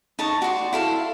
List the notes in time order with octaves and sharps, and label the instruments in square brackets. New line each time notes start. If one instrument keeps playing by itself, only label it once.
[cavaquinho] D#4 A5 C#6
F#4 D5 A5 C6
E4 A4 F5